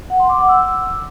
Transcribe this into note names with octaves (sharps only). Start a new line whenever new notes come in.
F#5
C6
D6
F#5
E6